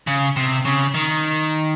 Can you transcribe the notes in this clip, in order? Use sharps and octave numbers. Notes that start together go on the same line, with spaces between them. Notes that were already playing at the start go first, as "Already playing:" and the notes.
C#3
C3
C#3
D#3